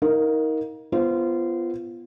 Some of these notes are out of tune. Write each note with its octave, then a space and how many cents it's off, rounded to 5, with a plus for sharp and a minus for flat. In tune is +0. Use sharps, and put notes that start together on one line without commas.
D#4 +30 A#4 +0 F5 +25
B3 +0 F4 -25 C5 +0